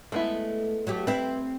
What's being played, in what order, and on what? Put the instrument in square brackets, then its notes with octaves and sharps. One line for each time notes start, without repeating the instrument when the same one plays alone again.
[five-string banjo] G#3 B3 E4 [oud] A3
[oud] F#3 A3 G4
[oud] C4 E4 [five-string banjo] B4